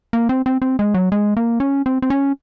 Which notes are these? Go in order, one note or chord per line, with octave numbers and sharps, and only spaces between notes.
A#3
C4
C4
C4
G#3
F#3
G#3
A#3
C#4
C4
C4
C#4